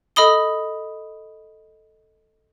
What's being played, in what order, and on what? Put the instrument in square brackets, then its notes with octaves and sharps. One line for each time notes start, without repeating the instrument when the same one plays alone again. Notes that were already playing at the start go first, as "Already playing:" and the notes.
[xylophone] A4 D#5 B5 D#6 G7